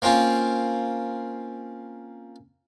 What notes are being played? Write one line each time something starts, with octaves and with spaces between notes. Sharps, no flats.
A#3 C4 C#4 F4